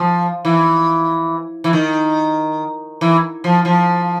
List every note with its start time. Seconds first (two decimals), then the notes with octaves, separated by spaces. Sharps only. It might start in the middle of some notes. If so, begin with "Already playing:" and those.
Already playing: F3
0.45 E3
1.64 E3
1.73 D#3
3.01 E3
3.44 F3
3.65 F3